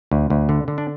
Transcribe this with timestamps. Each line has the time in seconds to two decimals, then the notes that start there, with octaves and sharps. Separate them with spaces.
0.11 D2
0.30 D2
0.49 D3
0.68 D3
0.78 D4